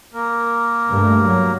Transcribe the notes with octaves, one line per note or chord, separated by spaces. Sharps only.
A#3 A#4
G2 A3
F#3